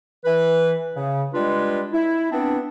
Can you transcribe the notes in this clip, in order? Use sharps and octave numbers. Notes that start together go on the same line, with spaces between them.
E3 B4
C#3
G3 G#3 D4 F4 B4
E4
B3 C4 D4